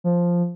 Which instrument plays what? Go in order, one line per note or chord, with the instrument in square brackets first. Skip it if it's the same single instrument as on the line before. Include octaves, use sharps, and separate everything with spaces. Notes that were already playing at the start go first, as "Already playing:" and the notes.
[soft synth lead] F3